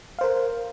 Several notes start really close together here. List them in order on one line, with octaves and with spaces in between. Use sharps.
F5 C5 A#4